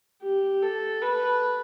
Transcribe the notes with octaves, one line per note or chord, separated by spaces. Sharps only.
G4
A4
B4